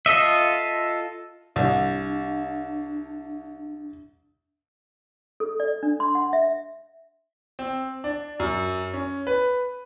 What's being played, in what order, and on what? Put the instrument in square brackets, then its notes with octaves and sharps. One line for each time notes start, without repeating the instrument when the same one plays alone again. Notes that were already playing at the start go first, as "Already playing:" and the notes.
[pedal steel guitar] F4 A4 D#5 E5
[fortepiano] C2 [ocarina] D4
[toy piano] A4
D5
D4
C6
F#5
E5
[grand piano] C4
D4
F#2
C#4
B4